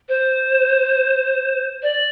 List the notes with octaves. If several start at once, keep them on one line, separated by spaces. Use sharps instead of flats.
C5
D5